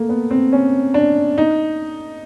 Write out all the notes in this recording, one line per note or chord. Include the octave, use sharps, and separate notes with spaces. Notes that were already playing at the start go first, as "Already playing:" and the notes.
Already playing: A3 A#3
B3
C4
C#4
D4
D#4